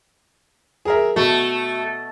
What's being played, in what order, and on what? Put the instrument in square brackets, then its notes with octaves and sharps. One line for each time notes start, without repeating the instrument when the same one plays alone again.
[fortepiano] G#4 A#4 E5
[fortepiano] B2 [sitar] A3 [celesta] F#4